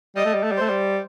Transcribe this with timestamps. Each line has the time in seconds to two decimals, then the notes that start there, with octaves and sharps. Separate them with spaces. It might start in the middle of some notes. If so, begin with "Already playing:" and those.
0.16 G3 D#5
0.25 A3
0.34 G3
0.43 A3
0.52 G3
0.57 A3 C5
0.70 G3